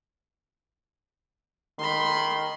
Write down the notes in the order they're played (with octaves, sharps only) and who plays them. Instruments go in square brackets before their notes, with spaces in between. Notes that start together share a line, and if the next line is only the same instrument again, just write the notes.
[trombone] D#3 [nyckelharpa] B5 C6